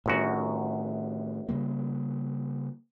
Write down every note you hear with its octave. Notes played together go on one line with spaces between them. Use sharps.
G1 F#2 A2 D#3 F#4
C#3 G3 A#3